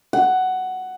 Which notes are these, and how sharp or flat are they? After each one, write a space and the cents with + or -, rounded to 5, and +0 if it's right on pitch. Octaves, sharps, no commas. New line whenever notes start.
F#5 +10